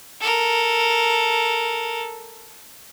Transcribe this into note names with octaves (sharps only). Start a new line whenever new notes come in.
A4 A#4